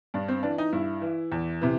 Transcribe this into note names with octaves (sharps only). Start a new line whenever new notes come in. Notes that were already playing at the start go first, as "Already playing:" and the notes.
G2 D4
C4
E3 D4
D#4
G2 E4
E3
E2
C3 E3